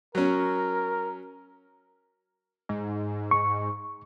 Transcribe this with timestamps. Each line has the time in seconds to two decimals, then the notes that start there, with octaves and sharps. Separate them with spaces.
0.15 F#3 C#4 A#4
2.69 G#2
3.31 C#6